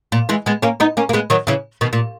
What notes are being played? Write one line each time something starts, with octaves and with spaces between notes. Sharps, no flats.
A#2
E3 G#3
G#3 B3
A#3 C#4
B3 D#4
A#3 C#4
A#3
G#3 B3
D#3 F#3
C#3 E3
B2 D#3
A#2